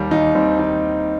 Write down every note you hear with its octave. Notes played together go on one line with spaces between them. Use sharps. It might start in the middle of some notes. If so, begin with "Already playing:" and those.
Already playing: D#2 D#3 G3
D#2 D#4
D#3 G3 C4
D#2 D#4